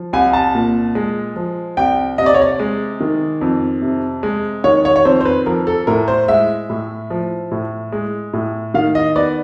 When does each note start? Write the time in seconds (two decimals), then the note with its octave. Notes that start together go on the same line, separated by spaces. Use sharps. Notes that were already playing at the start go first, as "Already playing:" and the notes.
Already playing: F3
0.13 C2 G#5
0.33 A5
0.55 A#2
0.95 G#3
1.36 F3
1.77 C2 G5
2.18 C3 D#5
2.26 D5
2.34 C#5
2.42 D5
2.59 G#3
3.00 D#3
3.41 F2
3.82 C3
4.23 G#3
4.64 D#3 C#5
4.85 C#5
4.96 C#5
5.05 F2 C5
5.21 C5
5.25 B4
5.46 F3 A#4
5.67 A4
5.87 A2 A#4
6.08 C5
6.28 G#3 E5
6.70 A2
7.10 F3
7.51 A2
7.92 G#3
8.33 A2
8.74 D#3 F5
8.95 D#5
9.16 B3 D5